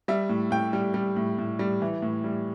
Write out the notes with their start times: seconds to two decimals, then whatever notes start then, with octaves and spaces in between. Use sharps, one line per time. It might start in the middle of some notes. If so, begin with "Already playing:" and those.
0.08 G3 E5
0.29 A2
0.51 A2 G5
0.73 G3
0.94 G3
1.16 A2
1.38 A2
1.59 G3
1.82 E3
2.02 A2
2.24 G3